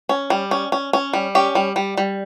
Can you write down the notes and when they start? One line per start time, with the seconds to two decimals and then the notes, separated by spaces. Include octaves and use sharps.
0.09 C#4
0.30 G3
0.51 C#4
0.72 C#4
0.93 C#4
1.13 G3
1.35 C#4 G4
1.55 G3
1.76 G3
1.97 G3